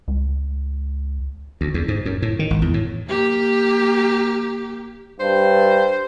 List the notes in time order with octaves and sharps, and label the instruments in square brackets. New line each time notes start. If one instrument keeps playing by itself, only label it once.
[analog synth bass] C#2
[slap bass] D2
E2
G#2
F#2
A2
D#3
G#1
E2
A2
[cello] A#3 G4
[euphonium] G2 [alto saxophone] C5